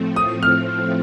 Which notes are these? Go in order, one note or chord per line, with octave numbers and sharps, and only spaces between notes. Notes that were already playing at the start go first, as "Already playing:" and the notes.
Already playing: A2 F3 A3 C4
D#6
F6